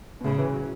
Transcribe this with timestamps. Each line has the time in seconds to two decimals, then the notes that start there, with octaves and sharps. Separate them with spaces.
0.21 B2
0.24 A2 C#3
0.38 E3
0.53 F#3